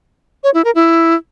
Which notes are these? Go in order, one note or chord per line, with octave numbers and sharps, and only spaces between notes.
C#5
E4
A#4
E4